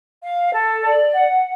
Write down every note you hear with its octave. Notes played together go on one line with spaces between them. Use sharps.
F5
A4
D5
F#5